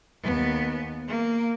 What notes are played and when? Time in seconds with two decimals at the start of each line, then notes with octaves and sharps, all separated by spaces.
0.23 D#2 B3
1.08 A#3